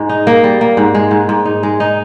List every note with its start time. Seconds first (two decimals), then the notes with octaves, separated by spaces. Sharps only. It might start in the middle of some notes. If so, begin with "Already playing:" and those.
Already playing: G#2 G#3
0.09 D#4
0.27 A#3
0.44 G3
0.61 A#3
0.77 G#2
0.95 G#3
1.11 G#2
1.29 G#2
1.45 D#4
1.63 G#3
1.80 D#4